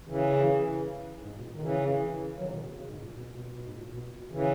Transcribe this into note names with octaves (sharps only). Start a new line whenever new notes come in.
C#3 E3
G#2
B2
A#2
D#3
C#3 E3
D#3 F#3
B2 D#3
C#3
C#3
G#2
A#2
B2
B2
B2
G#2
A#2
B2
C#3 E3